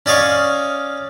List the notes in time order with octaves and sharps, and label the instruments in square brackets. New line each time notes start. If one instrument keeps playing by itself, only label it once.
[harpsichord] C#4 D5 D#5 F5 C#6